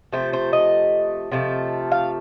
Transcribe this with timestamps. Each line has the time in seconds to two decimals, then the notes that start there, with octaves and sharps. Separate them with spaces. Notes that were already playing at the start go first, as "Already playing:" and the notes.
0.12 C3 F3 A3 C5
0.33 C5
0.53 D#5
1.32 C3 F3 A3
1.92 F5